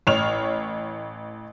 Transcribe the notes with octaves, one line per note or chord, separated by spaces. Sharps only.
A1 C#5 F6 F7